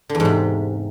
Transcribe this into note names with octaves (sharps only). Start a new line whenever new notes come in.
D3
E2
G#2
C3